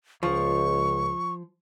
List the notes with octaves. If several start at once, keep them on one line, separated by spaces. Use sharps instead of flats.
C#2 F3 C#6